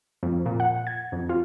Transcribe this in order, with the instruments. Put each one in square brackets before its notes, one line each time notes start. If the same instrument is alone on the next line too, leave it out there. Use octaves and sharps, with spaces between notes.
[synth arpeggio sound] F2
A#2
F#5
G#6
F2
F4